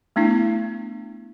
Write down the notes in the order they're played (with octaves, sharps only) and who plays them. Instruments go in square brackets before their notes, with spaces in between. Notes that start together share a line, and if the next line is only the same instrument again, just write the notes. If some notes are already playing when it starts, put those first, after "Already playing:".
[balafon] A3 B3 D4 E4